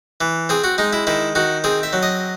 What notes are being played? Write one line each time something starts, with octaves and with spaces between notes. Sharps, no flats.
E3
C4 G#4
F#4
G#3 D#4
E4
D#3 E4
D#3 F#4
C4 G#4
E5
F#3
D#5